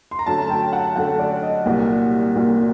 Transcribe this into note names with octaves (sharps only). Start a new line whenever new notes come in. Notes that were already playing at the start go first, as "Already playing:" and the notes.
C6
A#5
F#2 D3 A3 A5
G5
F#5
F#2 D3 A3 F#5
D5
D#5
C2 A#2 F#3 A#3 F#5
C2 A#2 F#3 A#3